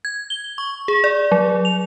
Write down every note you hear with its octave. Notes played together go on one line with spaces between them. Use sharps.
G#6
G7
C#6
G#4
D5
F#3
F7